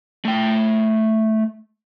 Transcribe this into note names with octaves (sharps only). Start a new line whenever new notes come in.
A3 G5